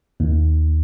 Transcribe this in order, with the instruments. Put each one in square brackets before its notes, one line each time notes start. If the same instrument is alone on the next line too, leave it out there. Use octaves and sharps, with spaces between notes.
[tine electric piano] D#2